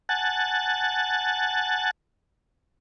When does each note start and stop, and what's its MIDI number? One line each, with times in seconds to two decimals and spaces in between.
0.09 1.91 78
0.09 1.91 80
0.09 1.91 81
0.09 1.91 90
0.09 1.91 93